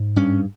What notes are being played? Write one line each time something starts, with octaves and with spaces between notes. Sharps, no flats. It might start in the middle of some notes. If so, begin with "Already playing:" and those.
Already playing: G#2
G2 C#4